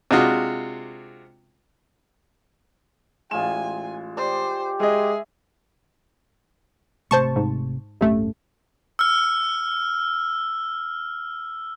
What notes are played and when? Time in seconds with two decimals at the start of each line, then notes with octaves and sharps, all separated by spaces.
0.11 C3 G#3 D4 F4 F#4 D#6
3.31 A1 G#3 F4 G#5 E7
4.17 G4 C5 D5
4.80 G#3 G#4 D#5 E5
7.11 G#1 C3 A3 C5 A5 C#6
7.36 G#2
8.01 D1 G1 C3 A3 C#4
8.99 E6 F6